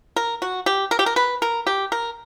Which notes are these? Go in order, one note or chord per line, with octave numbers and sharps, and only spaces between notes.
A#4
F#4
G4
A#4
G4
A#4
B4
A#4
G4
A#4